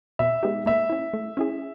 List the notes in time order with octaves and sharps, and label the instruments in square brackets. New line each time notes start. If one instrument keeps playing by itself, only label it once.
[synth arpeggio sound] B2 [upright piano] E5
[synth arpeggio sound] G#3 B3 D#4 G4
[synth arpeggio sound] A#3 [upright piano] E5
[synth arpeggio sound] C#4 E4
A3
C#4 E4 G#4